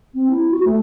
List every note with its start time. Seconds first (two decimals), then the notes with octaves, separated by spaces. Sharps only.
0.15 C4
0.31 E4
0.51 F#4
0.65 A3